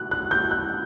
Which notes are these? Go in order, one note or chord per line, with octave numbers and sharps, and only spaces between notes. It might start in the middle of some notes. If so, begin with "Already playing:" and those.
Already playing: F#6
F#6
G6
F#6